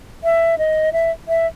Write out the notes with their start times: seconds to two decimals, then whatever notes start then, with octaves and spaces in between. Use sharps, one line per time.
0.24 E5
0.58 D#5
0.93 E5
1.28 E5